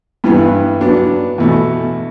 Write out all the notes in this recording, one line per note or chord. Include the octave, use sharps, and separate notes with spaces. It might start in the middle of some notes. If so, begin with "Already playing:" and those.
G2 E3 B3
F#3 B3 D4
E2 B2 A3